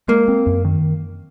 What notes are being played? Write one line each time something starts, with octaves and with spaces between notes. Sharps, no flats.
G#3 A#3
C4
F#2
D#3